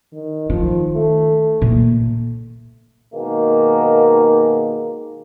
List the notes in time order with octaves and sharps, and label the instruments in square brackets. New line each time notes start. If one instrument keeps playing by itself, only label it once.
[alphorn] D#3
[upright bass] D#3 [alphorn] F3
[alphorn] A3
[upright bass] A#2
[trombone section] B2 D#3 G#3 A#3